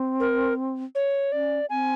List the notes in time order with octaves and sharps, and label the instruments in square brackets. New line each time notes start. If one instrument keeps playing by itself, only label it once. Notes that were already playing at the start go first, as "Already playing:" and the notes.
Already playing: [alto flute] C4
[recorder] A#4
C#5
[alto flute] C#4 [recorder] D5
[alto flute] C4 [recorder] G#5